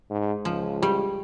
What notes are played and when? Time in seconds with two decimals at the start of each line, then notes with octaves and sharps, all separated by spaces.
0.10 G#2
0.45 C#2 F3
0.83 G3 G4